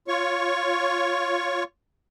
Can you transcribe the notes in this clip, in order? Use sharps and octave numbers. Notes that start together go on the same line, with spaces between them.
F4 C#5 C#6